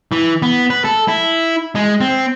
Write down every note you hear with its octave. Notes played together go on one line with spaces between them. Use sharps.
E3
B3
B4
A4
E4
G#3
C4